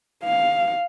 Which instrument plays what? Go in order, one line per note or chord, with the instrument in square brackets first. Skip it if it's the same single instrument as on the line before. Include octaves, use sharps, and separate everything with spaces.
[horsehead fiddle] F5